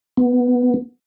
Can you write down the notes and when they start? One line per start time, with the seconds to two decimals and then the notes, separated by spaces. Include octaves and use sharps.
0.17 B3